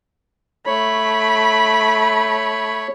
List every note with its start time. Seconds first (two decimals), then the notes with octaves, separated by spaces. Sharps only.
0.66 A3 C#5 B5